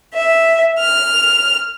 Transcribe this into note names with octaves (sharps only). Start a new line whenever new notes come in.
E5
F6